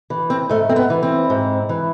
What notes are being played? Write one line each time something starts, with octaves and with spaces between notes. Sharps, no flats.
E3
C4
G#2 A3
C4
B3
E3
C4
G#2
E3